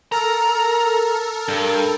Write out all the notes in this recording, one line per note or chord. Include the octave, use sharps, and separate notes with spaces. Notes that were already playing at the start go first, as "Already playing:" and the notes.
A4 A#4 A#5
G2